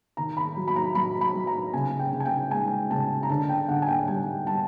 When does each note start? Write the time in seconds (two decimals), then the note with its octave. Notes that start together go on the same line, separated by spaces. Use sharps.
0.17 D#3 A#5
0.37 B5
0.57 F#3
0.68 B5
0.76 A#5
0.95 F#3 B5
1.21 B5
1.34 F#3
1.47 A#5
1.73 C#3 G#5
1.99 G5
2.12 C#3
2.20 G#5
2.25 G5
2.51 G#3 G#5
2.90 C#3 A5
3.23 A#5
3.30 D3 A5
3.49 G5
3.69 D3 F#5
3.82 G#5
3.88 G5
4.07 G3 G#5
4.46 G3 A5